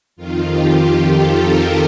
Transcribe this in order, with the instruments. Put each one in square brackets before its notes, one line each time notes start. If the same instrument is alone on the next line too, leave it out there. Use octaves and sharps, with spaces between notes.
[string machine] F2 D#3 F4
G4
G4
A4
A#4